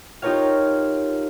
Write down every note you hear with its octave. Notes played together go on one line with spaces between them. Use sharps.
D#4 F4 G4 A#4 C#5 F5